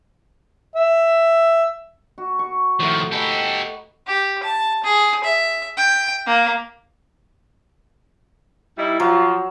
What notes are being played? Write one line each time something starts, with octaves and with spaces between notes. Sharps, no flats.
E5
F#4
C#6
A2 D#3 F3 F#5
G4 A4 B4 D#5 A#5
G4
A5
G#4
E5
G5
A#3
G3 D#4 E4
F3 F#3 F4